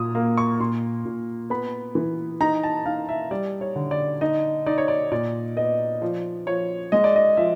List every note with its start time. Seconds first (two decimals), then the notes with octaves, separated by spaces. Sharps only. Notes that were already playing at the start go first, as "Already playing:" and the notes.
Already playing: A#2 D#6
0.15 A#3
0.38 C#6
0.60 A#2 C6
1.05 A#2
1.50 B3 B5
1.95 E3
2.41 D#4 A#5
2.63 A5
2.86 D#4 F5
3.09 E5
3.31 G3 D5
3.61 C#5
3.76 D3
3.91 D5
4.21 D#4 D#5
4.66 D#4 D5
4.78 C#5
4.88 D5
5.12 A#2 D5
5.56 B3 D#5
6.02 F3 D5
6.46 F3 C#5
6.92 G#3 D#5
7.04 D5
7.16 D#5
7.37 F3 E5